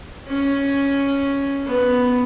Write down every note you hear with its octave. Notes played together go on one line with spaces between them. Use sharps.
C#4
B3